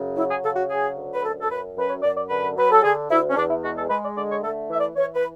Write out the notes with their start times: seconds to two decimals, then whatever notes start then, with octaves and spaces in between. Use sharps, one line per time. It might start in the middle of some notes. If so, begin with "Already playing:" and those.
Already playing: F#2 C#3
0.16 F#3 E4
0.30 G#4
0.43 C#3 A4
0.56 F#4
0.70 F#3 G#4
0.96 D2
1.14 B4
1.23 F#2 A4
1.40 A4
1.50 F#2 B4
1.76 F#2 B4
1.90 C#5
2.03 F#2 D5
2.16 D5
2.30 D3 B4
2.56 F#3 B4
2.71 A4
2.83 D3 G#4
3.09 D2 E4
3.30 C#4
3.36 E2 D4
3.49 E4
3.63 G#3 F#4
3.76 A4
3.90 G#3 B4
4.03 D5
4.16 D3 D5
4.30 C#5
4.43 A3 A4
4.69 E3 E5
4.78 D5
4.96 E3 C#5
5.14 B4